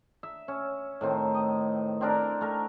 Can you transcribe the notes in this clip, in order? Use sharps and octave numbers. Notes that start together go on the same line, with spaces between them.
E5
C#4
A2 D#3 C4
D#5
C4 D4 A#4
A3 A#4